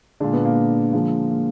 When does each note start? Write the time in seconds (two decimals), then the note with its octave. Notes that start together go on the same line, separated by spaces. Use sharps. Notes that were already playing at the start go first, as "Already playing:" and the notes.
0.20 A#2 D3 G#3 D4
0.34 B3
0.45 A#3
0.93 D3 F3 G#3 A#3
1.30 A#3